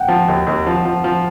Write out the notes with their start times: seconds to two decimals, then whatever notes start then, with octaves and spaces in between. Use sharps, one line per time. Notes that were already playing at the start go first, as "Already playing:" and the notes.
Already playing: F#5 G5
0.08 F3
0.28 D#2
0.47 D#2
0.67 F3
0.85 F3
1.04 F3